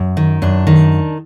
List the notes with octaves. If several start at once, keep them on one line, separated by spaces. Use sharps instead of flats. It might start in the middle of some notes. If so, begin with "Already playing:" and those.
Already playing: F#2
D#3
F#2 D4
D#3